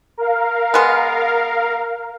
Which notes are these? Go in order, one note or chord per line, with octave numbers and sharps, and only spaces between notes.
A#4 F5
G#3 B3